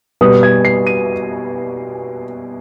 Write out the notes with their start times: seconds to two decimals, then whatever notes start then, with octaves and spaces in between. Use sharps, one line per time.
0.21 B2 G3 B3 D#6
0.43 G#6
0.65 C7
0.87 D#7